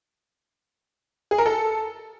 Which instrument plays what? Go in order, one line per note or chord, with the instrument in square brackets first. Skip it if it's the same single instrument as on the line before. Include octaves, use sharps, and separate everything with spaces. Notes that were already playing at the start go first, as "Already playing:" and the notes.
[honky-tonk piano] G#4
A#4
A4